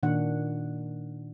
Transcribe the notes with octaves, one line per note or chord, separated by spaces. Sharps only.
A#2 D#3 D4 F#5